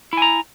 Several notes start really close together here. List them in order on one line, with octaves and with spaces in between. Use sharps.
E4 G#5 A#5